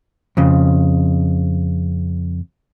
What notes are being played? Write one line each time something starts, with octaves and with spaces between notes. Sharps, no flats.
F2 C#3